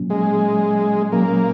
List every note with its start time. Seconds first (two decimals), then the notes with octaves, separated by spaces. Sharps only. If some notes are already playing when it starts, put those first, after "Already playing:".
Already playing: A#2 F#3 A#3 C#4
0.10 G#3
1.12 A#2 F#3 A#3 C#4